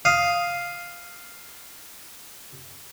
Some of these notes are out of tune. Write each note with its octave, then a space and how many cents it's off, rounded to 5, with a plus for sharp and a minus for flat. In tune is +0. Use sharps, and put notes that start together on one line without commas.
F5 +0 D#6 +5